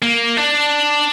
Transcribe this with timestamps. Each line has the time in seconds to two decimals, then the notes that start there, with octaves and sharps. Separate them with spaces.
0.02 A#3
0.37 D4